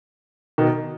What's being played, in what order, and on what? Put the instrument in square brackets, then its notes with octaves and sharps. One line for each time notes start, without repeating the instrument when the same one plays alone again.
[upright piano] B2 D#3